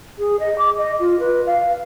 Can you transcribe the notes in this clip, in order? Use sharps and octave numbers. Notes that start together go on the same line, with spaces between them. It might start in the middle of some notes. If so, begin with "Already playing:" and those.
G#4
D#5
D6
D#5
F4
B4
F5